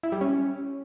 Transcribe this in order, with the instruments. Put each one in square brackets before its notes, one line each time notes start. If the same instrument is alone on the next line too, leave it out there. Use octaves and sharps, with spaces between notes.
[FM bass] E4
G3
C#4